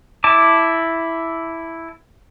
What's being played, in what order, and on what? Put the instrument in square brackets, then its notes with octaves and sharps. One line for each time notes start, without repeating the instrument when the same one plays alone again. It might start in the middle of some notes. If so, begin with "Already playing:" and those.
[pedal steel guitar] E4 A5 D6